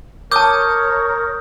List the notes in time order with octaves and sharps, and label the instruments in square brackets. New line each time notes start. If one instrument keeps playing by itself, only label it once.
[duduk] A#4 [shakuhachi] C#5 [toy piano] A5 D6 [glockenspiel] D#6 G6